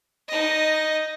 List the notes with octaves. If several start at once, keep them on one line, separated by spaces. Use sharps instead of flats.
D#4 D#5